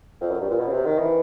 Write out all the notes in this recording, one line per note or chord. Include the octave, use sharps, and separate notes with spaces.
F2
F#2
G2
A#2
B2
C#3
C3
D#3
E3